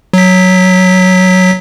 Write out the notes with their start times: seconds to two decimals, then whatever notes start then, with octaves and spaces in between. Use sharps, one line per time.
0.13 F#3 B6